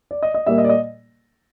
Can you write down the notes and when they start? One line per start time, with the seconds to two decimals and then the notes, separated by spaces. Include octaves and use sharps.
0.11 D5
0.23 D#5
0.34 D#5
0.46 A#2 G3 A#3 E5
0.58 D#5
0.64 D5
0.69 D#5